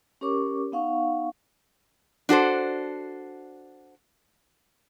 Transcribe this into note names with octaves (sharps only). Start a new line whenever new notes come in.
C#4 G4 A#4 C#5 C#6 D6
B3 D#4 F5 F#5 C#6
D4 F#4 A4 C5